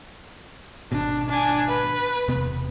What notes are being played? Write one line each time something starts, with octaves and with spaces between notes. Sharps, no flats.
G#1 B2 D4
D4 G#5
B4
E1 C3 B3